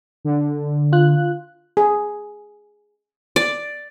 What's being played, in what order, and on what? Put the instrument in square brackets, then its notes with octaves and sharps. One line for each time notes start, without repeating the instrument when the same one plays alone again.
[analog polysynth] D3
[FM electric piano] F4 F#6
[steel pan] G#4
[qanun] D5